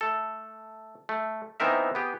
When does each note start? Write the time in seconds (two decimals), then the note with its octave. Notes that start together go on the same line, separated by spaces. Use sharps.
0.01 A3 A4
1.09 A3
1.60 E3 B3 C4 D#4 A#4 E5
1.95 B3 G4 G#4